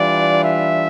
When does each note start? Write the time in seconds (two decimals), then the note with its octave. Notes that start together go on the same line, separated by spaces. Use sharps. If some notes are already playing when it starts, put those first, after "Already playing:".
Already playing: E3 G3 D4 F4 D5
0.43 E5